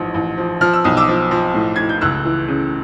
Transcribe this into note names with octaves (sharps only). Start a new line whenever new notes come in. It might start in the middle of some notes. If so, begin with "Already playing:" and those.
Already playing: A1 G#2 F3
A1
F3
F3 F6
E6
B1 D#6
D6 E6
F3
F3
A2
A2 G#6
G6
C#2 E6 F#6
E3
C#3